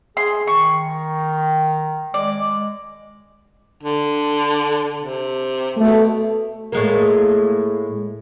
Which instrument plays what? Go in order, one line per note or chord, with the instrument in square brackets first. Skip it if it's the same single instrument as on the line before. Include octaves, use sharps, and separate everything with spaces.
[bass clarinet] G#4 [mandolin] C6
[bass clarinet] D#3 [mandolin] C#6
[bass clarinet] G#3 [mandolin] D5
[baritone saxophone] D3
C3
[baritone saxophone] B2 [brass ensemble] A3
[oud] A2 G#3 A#3